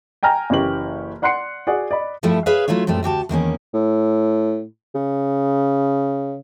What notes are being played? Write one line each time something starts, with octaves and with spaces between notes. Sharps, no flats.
G5 G#5 A#5 F6 A#6
F#1 E3 C#4 G4 F#7
D5 F#5 C6 F#6 C7 C#7
F#4 G#4 D5 F#5
D5 D#5 B5
G2 F3 G3 A3 E4
G#4 B4 C#5 E5 F5
F#3 A3 E4 F4 C#5
F#2 A#2 G3 A3 C4
D2 F#4 G4 A5
E2 D#3 A#3 C#4
A2
C#3